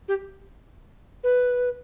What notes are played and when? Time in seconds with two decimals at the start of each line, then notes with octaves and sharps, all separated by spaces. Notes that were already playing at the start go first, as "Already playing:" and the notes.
0.08 G4
1.23 B4